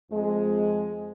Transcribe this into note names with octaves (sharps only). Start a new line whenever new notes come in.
F2 G#3